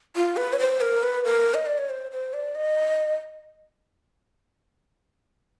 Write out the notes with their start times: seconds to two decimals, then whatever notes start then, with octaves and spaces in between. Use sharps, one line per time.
0.16 F4
0.37 B4
0.53 C#5
0.60 C5
0.81 A#4
1.03 B4
1.25 A#4
1.54 D#5
1.66 D5
1.78 C#5
1.90 C5
2.11 C5
2.33 D5
2.55 D#5